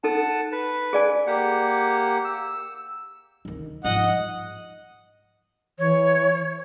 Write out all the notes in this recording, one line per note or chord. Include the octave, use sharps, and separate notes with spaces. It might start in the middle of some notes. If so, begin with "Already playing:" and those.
D#4 A4 F#5 A5
B4
G#4 D5 G#5
A#3 G4 F#5
E6
D2 D#3
G#2 F3 D#5 F#5
E3 C#5